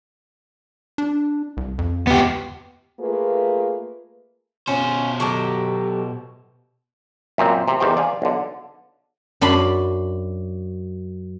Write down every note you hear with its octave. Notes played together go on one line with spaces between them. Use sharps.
D4
C2
F2
E2 B3 G4
A3 A#3 F4 G#4 B4
B2 C#4 F4 C5
F#3 G4 A4
F#2 A#2 C4
C3
E2 D#3 G4 C5 G5
D5 F5 G#5
B1 D3
F#2 D4 B5 C6